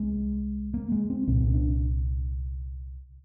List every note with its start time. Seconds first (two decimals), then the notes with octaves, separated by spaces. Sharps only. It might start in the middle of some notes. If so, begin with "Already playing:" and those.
Already playing: C2 G#3
0.74 A#3
0.92 G#3
1.10 C4
1.27 C2 A#2 C4
1.40 C4
1.54 D4